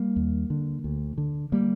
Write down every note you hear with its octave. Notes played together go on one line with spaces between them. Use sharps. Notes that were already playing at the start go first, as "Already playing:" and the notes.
Already playing: G3 A#3
D#2
D3
D2
D3
G3 A#3